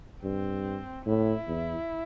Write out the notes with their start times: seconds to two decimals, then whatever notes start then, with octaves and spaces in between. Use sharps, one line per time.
0.24 G2 C4
1.05 A2 E4
1.47 E2